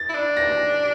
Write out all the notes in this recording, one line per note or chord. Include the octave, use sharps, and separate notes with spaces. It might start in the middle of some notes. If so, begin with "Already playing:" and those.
Already playing: A6
E4
D4
A#6